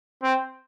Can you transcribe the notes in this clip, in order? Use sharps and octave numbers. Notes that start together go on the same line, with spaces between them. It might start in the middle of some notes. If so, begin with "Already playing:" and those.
C4